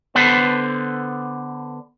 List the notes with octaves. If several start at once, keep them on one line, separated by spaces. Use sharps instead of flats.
D3 B3 A4 B4 C5